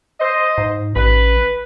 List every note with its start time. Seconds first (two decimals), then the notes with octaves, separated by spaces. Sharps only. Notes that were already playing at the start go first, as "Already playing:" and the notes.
0.20 C5 D#5
0.58 G#2
0.96 A1 B4